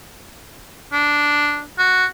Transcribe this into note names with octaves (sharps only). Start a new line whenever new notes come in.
D4
F#4